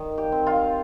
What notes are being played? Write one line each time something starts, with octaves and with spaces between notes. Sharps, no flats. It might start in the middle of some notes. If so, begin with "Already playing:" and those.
Already playing: D#3
G4
C4
F4